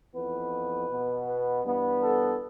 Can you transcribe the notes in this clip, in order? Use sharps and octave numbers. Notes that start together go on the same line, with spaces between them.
F2 E3 B3 B4
B2 B3
B4
G2 E3 B3
A4